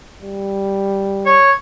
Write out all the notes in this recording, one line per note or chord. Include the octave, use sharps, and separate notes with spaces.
G3
C#5